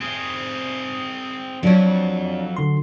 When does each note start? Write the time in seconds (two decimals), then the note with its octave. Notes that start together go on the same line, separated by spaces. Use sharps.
0.01 C4 G#4
1.63 F2 F#3 D4 F#4 C#5
2.57 D3 C6